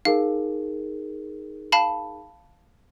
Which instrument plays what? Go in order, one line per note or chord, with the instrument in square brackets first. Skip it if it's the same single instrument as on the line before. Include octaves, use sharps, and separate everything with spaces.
[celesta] D#4 G#4 A#4 [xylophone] F5
[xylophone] F5 A5 B5